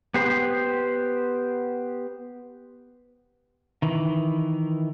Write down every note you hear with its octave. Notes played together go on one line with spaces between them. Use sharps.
B3 G4 C5
D#3 E3